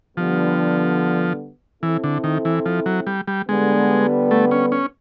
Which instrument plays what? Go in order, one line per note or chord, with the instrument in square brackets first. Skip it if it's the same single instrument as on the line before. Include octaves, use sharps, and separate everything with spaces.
[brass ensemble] D3 G3 B3 [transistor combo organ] F3
[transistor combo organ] E3 [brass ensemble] C4 E4 A4
[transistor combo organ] D3
D#3
E3
F3
F#3
G3
G3
[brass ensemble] D3 G3 B3 [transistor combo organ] G#3
[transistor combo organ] A3
C#4
C#4